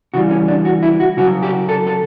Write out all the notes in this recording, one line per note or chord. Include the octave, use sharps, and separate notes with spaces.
C#3 E3 G3 F#4
C#4
D4
F#4
E4
F#4
C#3 F#3 F#4
G4
A4
A4